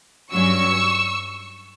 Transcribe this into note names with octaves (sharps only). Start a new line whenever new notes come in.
G2 F#3 C#4 C#6 E6